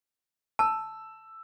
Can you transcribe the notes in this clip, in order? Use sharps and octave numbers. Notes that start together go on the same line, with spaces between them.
A5 E6